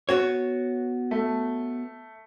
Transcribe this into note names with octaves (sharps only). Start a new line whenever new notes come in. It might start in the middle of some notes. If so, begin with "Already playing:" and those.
B3 F#4 C#5
A3